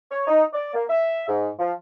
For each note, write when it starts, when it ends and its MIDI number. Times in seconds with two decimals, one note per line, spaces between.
0.10 0.26 73
0.27 0.44 63
0.53 0.70 74
0.74 0.84 58
0.89 1.24 76
1.27 1.49 44
1.59 1.71 53